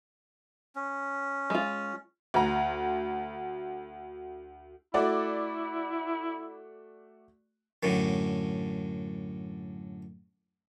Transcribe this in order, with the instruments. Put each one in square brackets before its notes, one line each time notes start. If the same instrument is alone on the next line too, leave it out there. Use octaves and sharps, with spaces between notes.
[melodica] C#4
[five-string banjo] G#3 F4
[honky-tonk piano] D2 A#5
[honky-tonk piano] A3 F#4 D5 [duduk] E4
[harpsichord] F#2 A2 D3